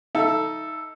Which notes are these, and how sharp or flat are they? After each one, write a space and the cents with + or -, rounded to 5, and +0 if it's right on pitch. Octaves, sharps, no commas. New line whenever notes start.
D#4 +20 A4 +0 E5 +30